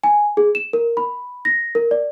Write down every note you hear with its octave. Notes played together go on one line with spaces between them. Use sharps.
G#5
G#4
E7
A#4
B5
A#6
A#4
D5